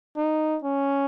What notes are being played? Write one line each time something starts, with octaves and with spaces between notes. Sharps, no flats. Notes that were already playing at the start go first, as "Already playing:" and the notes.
D#4
C#4